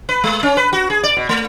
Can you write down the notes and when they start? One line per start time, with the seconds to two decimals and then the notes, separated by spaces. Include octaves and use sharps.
0.09 B4
0.24 G#3
0.43 C#4
0.57 B4
0.73 F#4
0.90 G#4
1.03 D5
1.17 B2
1.29 A3